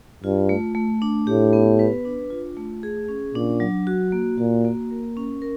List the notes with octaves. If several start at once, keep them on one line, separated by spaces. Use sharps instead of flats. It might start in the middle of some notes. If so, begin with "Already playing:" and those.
G2 F4
A3
A3
D4
A2 G4
B3
B4
D4
F4
A3
G#4
C#4
A#2 D4
F#3
F#4
A#3
A#2 F#4
A#3
A#4
C#4
A#4